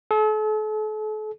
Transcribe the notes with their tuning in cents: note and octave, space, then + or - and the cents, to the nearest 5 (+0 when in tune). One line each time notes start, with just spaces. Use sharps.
A4 -40